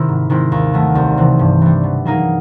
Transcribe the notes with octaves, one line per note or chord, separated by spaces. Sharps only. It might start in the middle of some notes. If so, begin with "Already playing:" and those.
Already playing: C3 D#3 C4 E4
G#2
D#3 G#3 C4 E4
D#2
D#3 F#3 A3
C2
C3 E3
G2
E3 G3
B2
F#3 A#3 D#4 G#4